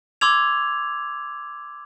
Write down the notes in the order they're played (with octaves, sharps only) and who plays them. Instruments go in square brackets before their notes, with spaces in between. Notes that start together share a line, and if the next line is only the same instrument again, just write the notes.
[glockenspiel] C6 D6 E6 G#6 F7